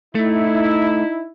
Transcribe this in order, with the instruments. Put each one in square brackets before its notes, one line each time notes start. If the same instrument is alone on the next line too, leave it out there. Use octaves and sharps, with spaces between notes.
[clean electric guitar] A3 [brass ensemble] D#4 E4